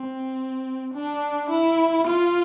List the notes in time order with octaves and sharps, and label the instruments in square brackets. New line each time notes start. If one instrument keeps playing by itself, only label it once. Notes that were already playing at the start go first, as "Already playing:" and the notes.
Already playing: [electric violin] C4
D4
E4
F4